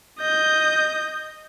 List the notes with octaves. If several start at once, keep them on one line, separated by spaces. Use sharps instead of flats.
D#5 G6